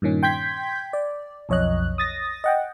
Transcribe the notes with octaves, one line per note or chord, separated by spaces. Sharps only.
G2 A#2 D#3 C#4
G5 C6 G6 G#6 B6
D5
B1 F2 C#5 D#5 F#6
D#6 A6 A#6
D#5 F#5 G5